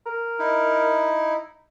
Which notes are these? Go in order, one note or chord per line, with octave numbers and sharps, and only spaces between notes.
A#4
D#4 E4